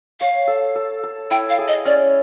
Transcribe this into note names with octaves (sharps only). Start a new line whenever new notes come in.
C#5 F5
A4
A4
A4
E4 G5
F5
G#4
D#5
C#4 D5